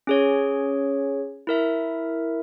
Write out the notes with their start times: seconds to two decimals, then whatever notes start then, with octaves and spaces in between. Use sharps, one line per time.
0.07 C#4 G#4 C#5
1.47 E4 A#4 E5